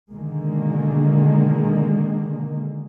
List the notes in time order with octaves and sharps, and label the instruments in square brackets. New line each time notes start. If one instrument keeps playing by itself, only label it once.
[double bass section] B2 D3 D#3 G#3 A#3